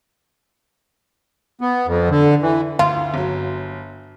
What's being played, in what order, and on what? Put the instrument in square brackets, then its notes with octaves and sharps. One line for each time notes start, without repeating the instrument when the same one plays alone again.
[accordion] B3
F2
D3
E3
[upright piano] D2 [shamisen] F4
[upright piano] G1 F#3